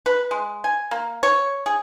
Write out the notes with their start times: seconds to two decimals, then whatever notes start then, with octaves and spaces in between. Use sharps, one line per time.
0.06 B4
0.31 G#3
0.64 G#5
0.91 A#3
1.23 C#5
1.66 G#4